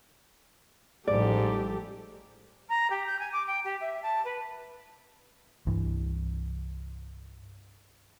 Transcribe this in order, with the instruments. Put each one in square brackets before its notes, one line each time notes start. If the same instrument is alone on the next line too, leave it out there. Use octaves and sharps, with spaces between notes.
[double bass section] A1 F3 G3 [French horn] G#2 [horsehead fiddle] G4 A4 [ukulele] D5
[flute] A#5
G4
G6
G#5
D6
G5
G4
E5
A5
B4
[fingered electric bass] C2 G2 E3